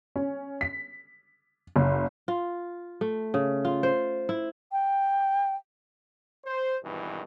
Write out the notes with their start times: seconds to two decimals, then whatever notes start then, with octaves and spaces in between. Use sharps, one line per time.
0.16 C#4
0.61 B6
1.76 F#1
2.28 F4
3.01 A3
3.34 C#3
3.65 F4
3.83 C5
4.29 E4
4.72 G5
6.45 C5
6.83 G#1 G2 B2 E3